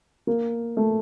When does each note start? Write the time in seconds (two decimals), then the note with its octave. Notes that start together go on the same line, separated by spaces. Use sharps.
0.27 A#3
0.77 A3